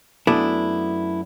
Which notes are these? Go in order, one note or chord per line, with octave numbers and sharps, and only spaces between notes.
F#2 A3 B3 D4 E4